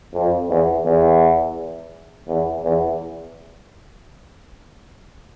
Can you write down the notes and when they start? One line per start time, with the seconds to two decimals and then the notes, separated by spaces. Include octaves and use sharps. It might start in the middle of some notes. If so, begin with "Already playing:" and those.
0.14 F2
0.49 E2
0.84 E2
2.28 E2
2.63 E2